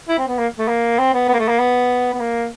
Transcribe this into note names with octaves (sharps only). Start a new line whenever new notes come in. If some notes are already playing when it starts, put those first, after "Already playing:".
E4
C4
B3
A#3
A3
A#3
C4
B3
B3
A#3
A3
A#3
B3
B3
A#3